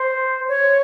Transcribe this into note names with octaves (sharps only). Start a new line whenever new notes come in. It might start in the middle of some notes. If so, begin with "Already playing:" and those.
Already playing: C5
C#5